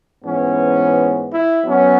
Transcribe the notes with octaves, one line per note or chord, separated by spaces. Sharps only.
G#2 E3 B3 C#4
E4
F#2 F#3 B3 C#4